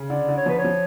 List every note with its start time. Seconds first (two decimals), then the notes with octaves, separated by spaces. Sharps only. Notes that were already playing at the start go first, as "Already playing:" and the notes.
Already playing: C#3
0.10 D3 D5
0.29 D3
0.37 C#5
0.46 F3
0.49 B4
0.58 C#5
0.64 F3